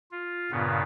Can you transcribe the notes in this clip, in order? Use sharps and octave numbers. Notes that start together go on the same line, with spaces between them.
F4
G2 A#2 C#3 B3